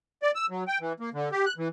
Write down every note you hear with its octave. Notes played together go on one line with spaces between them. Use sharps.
D5
E6
F#3
G5
E3
A#3
D3
G4
F#6
E3